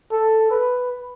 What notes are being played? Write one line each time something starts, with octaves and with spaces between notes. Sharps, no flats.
A4
B4